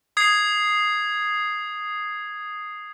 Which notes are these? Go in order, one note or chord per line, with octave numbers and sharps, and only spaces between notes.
D#6 G#6 C7